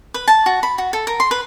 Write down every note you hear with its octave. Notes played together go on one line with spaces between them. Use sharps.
B4
A5
F#4
B5
F#4
A4
A#4
C6
B4